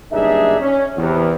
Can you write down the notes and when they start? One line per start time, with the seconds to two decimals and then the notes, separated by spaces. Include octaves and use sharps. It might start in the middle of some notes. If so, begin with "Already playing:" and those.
0.12 F#1 G2 D4 D#4 G#4 E5
0.60 C#4
0.97 E2 C3